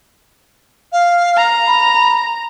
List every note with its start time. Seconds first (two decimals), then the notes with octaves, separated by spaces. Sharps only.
0.92 F5
1.37 A#5
1.67 B5